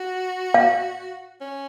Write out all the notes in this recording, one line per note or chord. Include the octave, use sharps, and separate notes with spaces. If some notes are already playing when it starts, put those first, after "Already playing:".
Already playing: F#4
F5
C#4